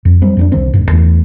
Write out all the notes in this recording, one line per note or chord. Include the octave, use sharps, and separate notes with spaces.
F2
F#3 G3 C4
F2 A#3 D4
C2 D#3 C4
E1 G2
E2 E3 A3